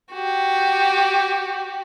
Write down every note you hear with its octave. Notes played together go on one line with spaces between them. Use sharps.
F#4 G4